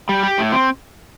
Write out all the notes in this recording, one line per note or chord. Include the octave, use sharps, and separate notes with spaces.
G3
G4
A2
C4